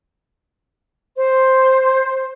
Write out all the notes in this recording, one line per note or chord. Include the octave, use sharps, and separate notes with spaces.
C5